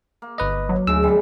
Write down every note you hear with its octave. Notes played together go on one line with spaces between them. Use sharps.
A#3
G1 B4 D#5
F#3
D2 C#3 G#3 E6
C3 G3 G#3